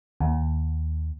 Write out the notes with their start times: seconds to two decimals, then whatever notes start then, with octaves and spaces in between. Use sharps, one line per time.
0.21 D#2